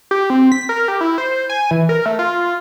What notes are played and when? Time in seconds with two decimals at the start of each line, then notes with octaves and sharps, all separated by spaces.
0.11 G4
0.30 C4
0.52 B6
0.69 A#4
0.88 G4
1.01 E4
1.18 C5
1.50 G#5
1.71 E3
1.89 A#4
2.06 A3
2.19 F4